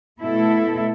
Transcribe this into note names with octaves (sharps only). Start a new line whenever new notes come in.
B2 A3 E4 A4